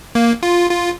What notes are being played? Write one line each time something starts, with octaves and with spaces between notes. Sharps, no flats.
A#3
F4
F4